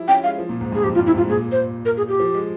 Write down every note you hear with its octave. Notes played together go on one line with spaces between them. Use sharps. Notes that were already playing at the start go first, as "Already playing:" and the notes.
Already playing: F3 G3 E4
C#4 G5
G#3 F5
F3
A#2
G#2
G2 G#4
F2 G4
F4
G2
E4
G#2 F4
A#2 G#4
C5
A#4
G#4
G4
F3
G#3